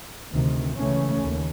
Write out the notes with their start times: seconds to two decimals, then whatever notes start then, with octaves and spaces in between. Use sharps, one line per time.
0.32 D2 C3 D#3
0.77 C#2 C#3 E3 A3 C#4
1.22 D#2